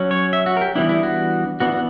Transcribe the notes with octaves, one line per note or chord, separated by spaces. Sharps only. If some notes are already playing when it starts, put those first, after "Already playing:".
Already playing: F#3 C#4
C#5
E5
F#4
A#4
G4
E3 G3 B3 D4 E4
E4
F#4
E3 B3 D4 F#4
F#4